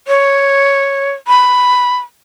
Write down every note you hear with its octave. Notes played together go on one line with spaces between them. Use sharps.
C#5
B5